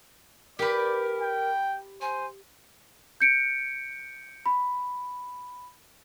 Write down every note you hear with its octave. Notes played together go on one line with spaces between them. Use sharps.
G4 A#4 B4 D5
G5
C5 G#5
G6 C#7 D7
B5